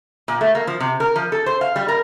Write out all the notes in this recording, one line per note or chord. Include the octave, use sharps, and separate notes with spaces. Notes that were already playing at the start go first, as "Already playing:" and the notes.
A#2
A3
A#3
F3
C3
A#4
F3
A4
C5
F5
G3
A#4